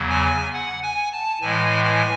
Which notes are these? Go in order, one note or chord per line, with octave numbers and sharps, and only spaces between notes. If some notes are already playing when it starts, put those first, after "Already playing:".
Already playing: E2 C#3 F#3
G#5
F#5
G#5
A5
A2 E3 G#3 G#5
G#5